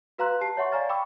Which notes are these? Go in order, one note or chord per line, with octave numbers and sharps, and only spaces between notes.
F#4 B4 F5 A#5 C6 F#6
G4 A5 C7
C#5 E5 F#5 C6 C#6
D5 F5 G#5 A#5 F6 A6
G5 B5 C#6 D6 E6